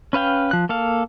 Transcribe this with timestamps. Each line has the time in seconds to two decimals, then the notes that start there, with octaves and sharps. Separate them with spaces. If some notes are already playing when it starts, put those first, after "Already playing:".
0.13 C#4 B4 F5 G5
0.51 F3 F#6
0.69 A#3 A4 F5